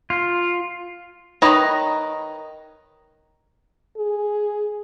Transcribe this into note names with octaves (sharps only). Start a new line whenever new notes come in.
F4
D#3 D#4 B4 C#5 D#5
G#4